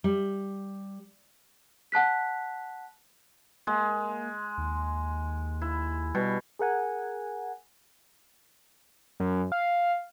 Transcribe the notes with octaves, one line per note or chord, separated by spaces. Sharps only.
G3
F#5 A5 F#6 B6
G#3 A#3
D#2
E4
B2 G3
G#4 A#4 F#5 G#5
F#2
F5